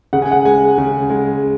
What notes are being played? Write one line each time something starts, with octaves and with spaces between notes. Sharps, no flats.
C#3 F#5
G#5
F#5
G#3 G#5
C#3
G#3